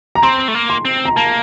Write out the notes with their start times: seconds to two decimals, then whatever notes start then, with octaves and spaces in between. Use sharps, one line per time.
0.15 A#5
0.23 C4 C6
0.48 A3
0.54 A#3
0.70 C6
0.85 C4
1.05 A#5
1.16 A#3 A5